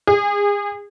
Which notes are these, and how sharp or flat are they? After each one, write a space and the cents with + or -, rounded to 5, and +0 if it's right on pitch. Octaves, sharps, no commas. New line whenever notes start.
G#4 -30